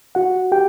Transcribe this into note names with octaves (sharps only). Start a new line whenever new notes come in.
F#4 F#5
G4 G5